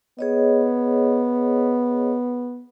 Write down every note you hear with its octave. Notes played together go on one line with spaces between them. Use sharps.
B3 G#4 C#5 D#5